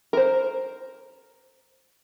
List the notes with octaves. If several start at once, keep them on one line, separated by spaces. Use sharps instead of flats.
A#4 C5